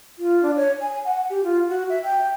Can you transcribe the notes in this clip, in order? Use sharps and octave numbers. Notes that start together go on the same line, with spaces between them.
F4
D4
C#5
G#5
F#5
G4
F4
F#4
E5
G5